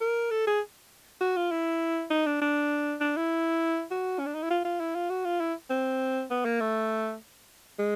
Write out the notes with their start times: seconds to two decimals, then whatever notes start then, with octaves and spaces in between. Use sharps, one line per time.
0.01 A#4
0.31 A4
0.47 G#4
1.21 F#4
1.37 F4
1.51 E4
2.10 D#4
2.27 D4
2.41 D4
3.01 D4
3.16 E4
3.91 F#4
4.19 C#4
4.26 D4
4.35 D#4
4.43 E4
4.50 F4
4.65 F4
4.80 E4
4.95 F4
5.10 F#4
5.25 F4
5.40 E4
5.70 C4
6.31 B3
6.45 A#3
6.61 A3
7.79 G#3